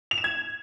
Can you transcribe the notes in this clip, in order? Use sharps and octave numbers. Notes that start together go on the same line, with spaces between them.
F7
E7
G#6